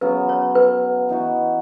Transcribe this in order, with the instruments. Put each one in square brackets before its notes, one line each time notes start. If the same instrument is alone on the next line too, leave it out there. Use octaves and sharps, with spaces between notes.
[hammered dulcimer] C#3 F#3 B3 [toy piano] B4
[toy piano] C#5
B4
[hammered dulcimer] E3 B3 D#4 F#4